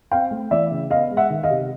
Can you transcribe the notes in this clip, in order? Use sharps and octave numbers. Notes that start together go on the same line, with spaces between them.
C4 F5 G5
A3
E3 D5 E5
C#3
B3 D#5 F5
G#3
E5 F#5
D#3
D#5 F5
C3